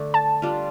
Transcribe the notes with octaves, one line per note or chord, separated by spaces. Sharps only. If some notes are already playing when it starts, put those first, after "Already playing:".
Already playing: D3 A3 D4
A5
G3 D4 F4